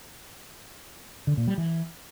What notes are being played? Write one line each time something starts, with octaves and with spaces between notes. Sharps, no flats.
D3
A#2
G3
E3